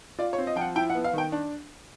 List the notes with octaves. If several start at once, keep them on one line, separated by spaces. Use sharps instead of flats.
F4 D5
C#5
C4
D#5
F3 F#5 G5
E4 G5
F#5
B3
F5
D#3 G5
D4